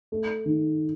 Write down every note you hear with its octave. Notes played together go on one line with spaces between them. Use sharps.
A3
D#3